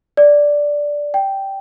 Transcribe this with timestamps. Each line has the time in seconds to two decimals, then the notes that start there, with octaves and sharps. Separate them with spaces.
0.17 D5
1.14 G5